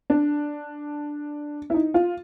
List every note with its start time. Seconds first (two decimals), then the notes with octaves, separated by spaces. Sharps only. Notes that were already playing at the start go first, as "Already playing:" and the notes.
0.10 D4
1.70 E4
1.74 D#4
1.94 F4